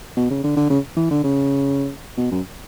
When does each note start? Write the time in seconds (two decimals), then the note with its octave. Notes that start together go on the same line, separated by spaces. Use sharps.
0.17 B2
0.30 C#3
0.44 D3
0.56 D3
0.70 C#3
0.97 E3
1.11 D3
1.24 C#3
2.17 B2
2.31 F#2